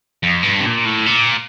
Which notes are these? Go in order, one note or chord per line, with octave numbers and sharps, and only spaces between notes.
F2
G2
C3
A#2
A2
A#2